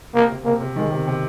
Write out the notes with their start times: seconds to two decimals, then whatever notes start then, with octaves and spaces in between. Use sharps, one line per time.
0.14 C3 A#3
0.29 C3
0.45 C3 A#3
0.61 C3
0.76 D#3 G#3
0.91 C3
1.07 C3